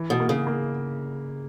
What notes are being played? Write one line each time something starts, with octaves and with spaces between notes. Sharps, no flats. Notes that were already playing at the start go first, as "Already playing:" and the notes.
Already playing: E3
B2
A#3
C#3
A#3